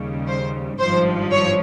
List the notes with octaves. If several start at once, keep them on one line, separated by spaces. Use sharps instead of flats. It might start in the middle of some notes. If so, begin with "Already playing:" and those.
Already playing: D#2 C#3 G3
C5
G#1 G2 F3 C5
C#5